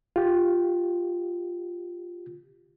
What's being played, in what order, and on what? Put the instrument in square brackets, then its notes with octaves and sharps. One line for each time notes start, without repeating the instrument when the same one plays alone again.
[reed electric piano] F4 G4